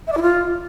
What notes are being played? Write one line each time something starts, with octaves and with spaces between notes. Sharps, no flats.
E5
D5
E4
F4